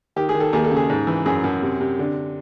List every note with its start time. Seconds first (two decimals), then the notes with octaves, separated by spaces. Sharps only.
0.16 D#3 G4
0.29 G#4
0.35 D#3
0.40 A4
0.53 D#2 G#4
0.64 A4
0.72 C#3 G#4
0.90 G#2
1.07 E3
1.26 F#2 G#4
1.44 F#2
1.62 C3
1.80 C3
1.99 D3